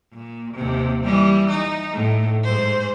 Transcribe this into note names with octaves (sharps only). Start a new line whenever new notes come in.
A#2
D#2 C3
E3 G3
D#4
A2
G#2 C5